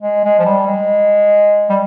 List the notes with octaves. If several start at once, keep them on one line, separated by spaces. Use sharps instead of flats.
G#3
G#3
F3
G3
G#3
G3